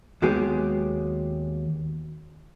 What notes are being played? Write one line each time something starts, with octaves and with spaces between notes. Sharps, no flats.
D#2 F#3 G#3 B3 G4 G#4